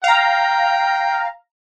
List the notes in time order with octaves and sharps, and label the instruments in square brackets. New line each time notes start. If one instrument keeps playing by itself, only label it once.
[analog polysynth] F5 A#5 [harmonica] G5